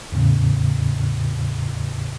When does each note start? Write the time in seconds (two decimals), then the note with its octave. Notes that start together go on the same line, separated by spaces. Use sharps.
0.12 E2 A2 C#3